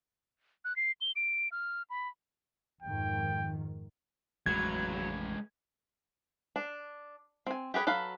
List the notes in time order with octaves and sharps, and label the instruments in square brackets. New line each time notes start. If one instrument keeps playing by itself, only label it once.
[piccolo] F#6
C7
G7
D7
F6
B5
[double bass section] F2 G#2 D#3 [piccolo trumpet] G5
[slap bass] A1 F2 [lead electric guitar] F#3 [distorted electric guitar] G#3 B4 [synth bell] G#6
[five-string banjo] D4
C4 G#5
G4 G#4 B4 C#5
F#3 A4 B4 F5